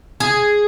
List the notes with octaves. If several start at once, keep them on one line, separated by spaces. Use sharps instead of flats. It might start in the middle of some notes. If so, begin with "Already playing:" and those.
G#4